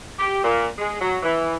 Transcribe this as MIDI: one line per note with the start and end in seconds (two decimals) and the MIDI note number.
0.18 0.41 67
0.43 0.66 46
0.78 0.95 56
1.01 1.16 54
1.23 1.56 52